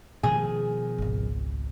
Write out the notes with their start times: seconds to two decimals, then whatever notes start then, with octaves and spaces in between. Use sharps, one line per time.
0.23 B2 D#3 F3 G#4
0.98 G#1 C#2